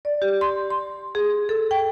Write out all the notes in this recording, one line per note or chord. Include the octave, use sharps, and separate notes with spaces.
D5
G4
C6
C6
G#4
A4
G5